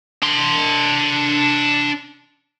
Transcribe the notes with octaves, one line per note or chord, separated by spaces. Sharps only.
D4 C6